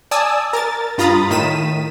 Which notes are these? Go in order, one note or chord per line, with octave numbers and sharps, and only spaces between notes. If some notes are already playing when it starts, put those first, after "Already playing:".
D5 G#5 A5 D#6 E6
A#4 A6
G2 F4 A#5 B5 D#6 A6
A2 D#3 B6 D#7 E7